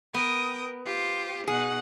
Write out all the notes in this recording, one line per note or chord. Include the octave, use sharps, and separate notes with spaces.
B3 A#4 G5 D#6
F4 G4 C5
B2 D#4 G#4 F#5